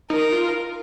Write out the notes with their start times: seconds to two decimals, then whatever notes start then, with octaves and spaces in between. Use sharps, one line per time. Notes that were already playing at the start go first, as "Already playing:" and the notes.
0.10 D#4 A#4
0.32 F4